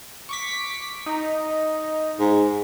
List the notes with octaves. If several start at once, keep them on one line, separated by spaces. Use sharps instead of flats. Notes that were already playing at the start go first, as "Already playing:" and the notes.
C#6 D6 B6
D#4
G#2